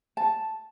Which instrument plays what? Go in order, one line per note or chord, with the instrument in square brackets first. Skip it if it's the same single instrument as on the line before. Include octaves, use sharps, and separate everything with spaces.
[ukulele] A5